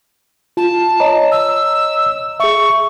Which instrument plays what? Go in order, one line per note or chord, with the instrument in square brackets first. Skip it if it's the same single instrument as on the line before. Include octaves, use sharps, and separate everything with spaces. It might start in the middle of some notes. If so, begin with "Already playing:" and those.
[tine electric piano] F4 [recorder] A5
[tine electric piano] C#5 D#5 A#5
[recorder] E6
[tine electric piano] G#4 E5 [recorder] C#6